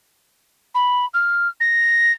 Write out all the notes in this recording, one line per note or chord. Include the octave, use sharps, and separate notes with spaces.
B5
F6
A#6